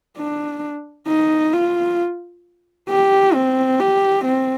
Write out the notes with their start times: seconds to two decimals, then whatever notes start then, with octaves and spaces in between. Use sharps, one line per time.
0.18 D4
1.08 D#4
1.53 F4
2.90 G4
3.34 C4
3.80 G4
4.25 C4